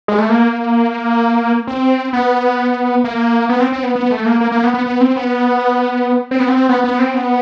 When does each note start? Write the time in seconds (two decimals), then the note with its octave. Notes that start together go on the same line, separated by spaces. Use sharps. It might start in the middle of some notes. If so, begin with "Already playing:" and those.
0.08 G#3
0.19 A3
0.29 A#3
1.67 C4
2.13 B3
3.04 A#3
3.49 B3
3.60 C4
3.72 C4
3.83 B3
3.95 B3
4.11 A3
4.26 A#3
4.41 A#3
4.52 A#3
4.63 B3
4.74 B3
4.86 B3
5.01 C4
5.16 B3
6.31 C4
6.40 B3
6.48 C4
6.69 B3
6.84 B3
6.99 C4
7.14 B3